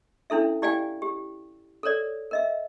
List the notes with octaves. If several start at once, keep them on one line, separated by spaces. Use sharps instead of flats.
C#4 D4 E4 A4 E5
E4 G4 D5 F5 G5 G#5
G4
A4 A#4 C#5 D5
A#4 D#5 E5